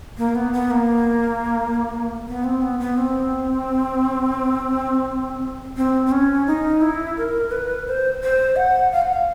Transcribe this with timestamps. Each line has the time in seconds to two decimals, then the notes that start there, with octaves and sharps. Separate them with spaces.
0.18 A#3
0.35 B3
0.53 B3
0.71 A#3
2.28 B3
2.44 C4
2.62 B3
2.80 B3
2.98 C4
5.77 C4
6.06 C4
6.11 C#4
6.47 D#4
6.81 E4
7.17 A#4
7.51 B4
7.87 C5
8.22 C5
8.56 F#5
8.92 F5
9.01 F#5
9.13 F5